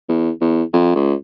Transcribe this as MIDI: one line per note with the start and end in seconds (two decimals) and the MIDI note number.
0.09 0.31 40
0.41 0.63 40
0.73 0.95 41
0.96 1.14 37